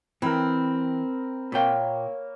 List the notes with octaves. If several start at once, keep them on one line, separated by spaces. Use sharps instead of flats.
E3 C4 A#4 G5 B5
A#2 A#3 C#5 G5 E6